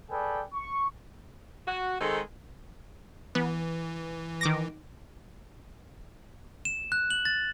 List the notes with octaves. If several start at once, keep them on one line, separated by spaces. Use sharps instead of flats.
G#4 A4 B4 D5 G5
C#6
F#4
D#3 G#3 C4 D#4 G#4 A4
E3 B3
D#3 D6 A#6
E7
F#6
F#7
A6